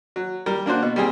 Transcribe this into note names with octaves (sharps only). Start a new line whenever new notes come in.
F#3
G3 A#4
A#3 D4 F#4 C5
B2
G3 A#3 C4 G#4